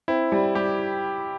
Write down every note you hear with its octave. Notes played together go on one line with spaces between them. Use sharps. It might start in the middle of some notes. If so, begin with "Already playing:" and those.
C4 E4
G3
G3 G4